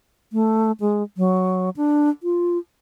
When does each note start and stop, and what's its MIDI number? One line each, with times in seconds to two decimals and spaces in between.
0.33 0.72 57
0.80 1.03 56
1.17 1.70 54
1.77 2.09 62
2.23 2.58 65